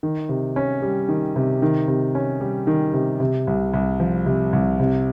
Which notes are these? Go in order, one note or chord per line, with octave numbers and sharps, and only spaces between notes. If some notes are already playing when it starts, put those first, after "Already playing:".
D#3
C3
C#4
G3
D#3
C3
D#3
C3
C#4
G3
D#3
C3
C3
C2
C2
F3
C3
C2
C3